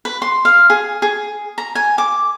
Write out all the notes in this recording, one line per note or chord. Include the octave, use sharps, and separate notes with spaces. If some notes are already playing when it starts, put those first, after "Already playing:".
B4
C6
F5
G#4
G#4
A#5
G#5
D6